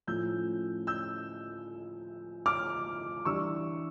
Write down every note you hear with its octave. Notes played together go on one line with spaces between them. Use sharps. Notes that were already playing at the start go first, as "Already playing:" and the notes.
A2 F3 C#4 E6 G6
E6 G6
D6 F6
E3 G3 D4 C#6 E6